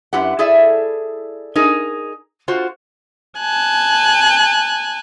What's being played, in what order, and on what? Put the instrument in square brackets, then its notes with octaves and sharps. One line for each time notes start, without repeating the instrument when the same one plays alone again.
[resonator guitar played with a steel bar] F#2 E4 G4 B4 F#5
E4 G#4 A4 D5 E5
D#4 G#4 A#4
F4 F#4 C5
[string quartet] G#5 A5 F#6